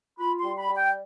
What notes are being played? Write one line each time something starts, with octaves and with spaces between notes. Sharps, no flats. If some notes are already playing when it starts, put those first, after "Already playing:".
F4 B5
C6
G3
B5
G3
G5